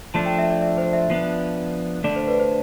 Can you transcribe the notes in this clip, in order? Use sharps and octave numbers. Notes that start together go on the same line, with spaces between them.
F3 A3 D4 A5
G5
E5
D5
E5
C5
E5
F3 B3 D4
D3 A3 D4 D5
C5
B4
C5